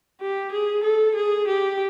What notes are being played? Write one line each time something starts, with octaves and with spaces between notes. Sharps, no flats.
G4
G#4
A4
G#4
G4